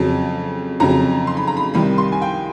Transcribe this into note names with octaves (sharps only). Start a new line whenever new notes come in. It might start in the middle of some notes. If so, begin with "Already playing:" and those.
Already playing: F2 C#3 F#3 A5
F2 C#3 F#3 A#5
C6
B5
A#5
B5
C2 C3 D#3 G3 B5
C6
G#5
G5